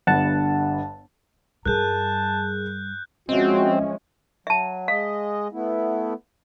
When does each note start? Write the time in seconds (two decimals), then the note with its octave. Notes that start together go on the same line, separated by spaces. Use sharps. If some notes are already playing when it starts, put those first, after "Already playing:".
0.07 G1 G2 F#5 A5
1.65 G2 G3 G#4 A#4 A5 F#6 G6
3.29 F3 G#3 C4 C#4 F#4 D#5 E5
4.47 F#3 E5 A5
4.88 G#3 D#5 F5
5.53 A3 B3 E4